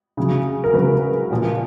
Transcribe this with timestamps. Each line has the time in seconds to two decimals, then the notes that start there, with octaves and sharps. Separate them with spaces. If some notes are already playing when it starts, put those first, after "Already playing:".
0.17 C#3 F#3
0.64 A#4
0.74 C#3 F#3 B4
1.31 A#2 F3